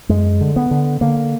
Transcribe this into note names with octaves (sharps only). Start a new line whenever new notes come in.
F#2 G#3
D3
B3
D3
D3 A#3